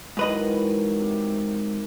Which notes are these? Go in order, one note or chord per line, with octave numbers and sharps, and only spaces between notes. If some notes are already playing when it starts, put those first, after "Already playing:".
G#2 D#3 E3 F#3 B4 D#5
C3